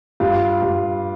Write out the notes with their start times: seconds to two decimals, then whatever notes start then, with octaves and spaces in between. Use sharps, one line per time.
0.20 G2 F4
0.62 G2